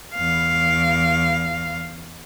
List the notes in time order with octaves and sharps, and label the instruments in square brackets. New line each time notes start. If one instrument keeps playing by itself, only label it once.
[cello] E2 F5